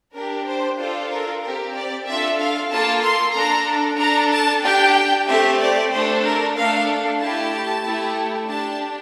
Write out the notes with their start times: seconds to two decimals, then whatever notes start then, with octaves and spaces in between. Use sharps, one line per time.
0.15 D4 G4 A#4
0.47 C5
0.79 D4 F4 A4 C5
1.11 A#4
1.43 C4 G4 A#4
1.76 D5
2.07 D4 F4 A4 E5
2.40 F5
2.71 A#3 F4 A4 A5
3.03 C6
3.36 D4 A4 A#5
3.99 D4 A4 A#5
4.32 A5
4.64 D4 G4 G5
5.28 A3 C4 G4 E5
5.60 D5
5.92 A3 D4 A4 C5
6.25 A#4
6.56 A3 D4 A4 F5
7.20 A3 E4 G4 A5
7.84 A3 E4 G4
8.48 D4 G4 A5